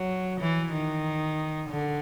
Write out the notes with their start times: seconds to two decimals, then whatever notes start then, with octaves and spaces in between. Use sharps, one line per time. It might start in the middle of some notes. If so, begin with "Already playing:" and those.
Already playing: F#3
0.40 E3
0.72 D#3
1.69 D3